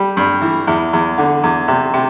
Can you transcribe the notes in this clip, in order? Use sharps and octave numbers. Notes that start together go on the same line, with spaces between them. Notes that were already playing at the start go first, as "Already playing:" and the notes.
Already playing: G3
G2
E3
E2
E2
D3
E2
C3
C3